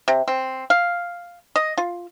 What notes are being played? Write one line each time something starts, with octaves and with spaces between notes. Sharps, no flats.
C3
C4
F5
D#5
F4